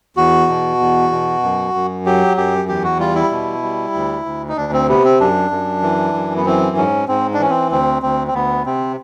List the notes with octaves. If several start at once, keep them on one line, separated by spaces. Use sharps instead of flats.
E2 F#4
B2
E2
B2
F#2
F#2
F#3 G4
F#2 G4
E2 G4
F#4
G3 F4
E4
B2
G3
D2
D2
D#4
D2 D4
C4
C3 B3
C4
F#2 D4
F#2
E3
F#2
B3
E3 C4
G#2 C#4
G#2 C4
D4
E3 C#4
C4
D2 C4
D2 C4
C4
D2 B3
C3 C4